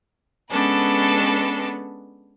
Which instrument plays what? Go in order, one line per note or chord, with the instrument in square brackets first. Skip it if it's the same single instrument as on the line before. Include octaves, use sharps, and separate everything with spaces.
[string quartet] G#3 B3 C#4 D4 A4 B4